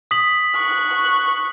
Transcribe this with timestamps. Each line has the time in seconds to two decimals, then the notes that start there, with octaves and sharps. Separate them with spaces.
0.11 D#6 B6 F#7
0.55 C#6 F#6